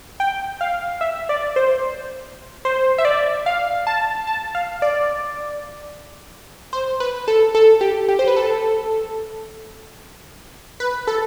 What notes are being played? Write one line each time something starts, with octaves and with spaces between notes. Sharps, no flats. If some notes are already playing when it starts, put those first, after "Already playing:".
G5
F5
E5
D5
C5
C5
E5
D5
F5
A5
A5
F5
D5
C5
B4
A4
A4
G4
G4
C5
B4
A4
B4
A4